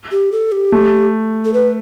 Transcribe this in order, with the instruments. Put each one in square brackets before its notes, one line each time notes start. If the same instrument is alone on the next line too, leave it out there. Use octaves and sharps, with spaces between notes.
[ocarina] G4
A4
G4
[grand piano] A3
[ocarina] A4
B4